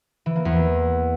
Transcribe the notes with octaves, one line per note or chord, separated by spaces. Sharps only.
E3
A#3
E2